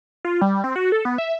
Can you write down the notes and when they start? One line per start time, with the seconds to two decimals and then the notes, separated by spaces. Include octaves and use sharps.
0.25 F4
0.42 G3
0.64 C4
0.76 F#4
0.92 A4
1.05 B3
1.18 E5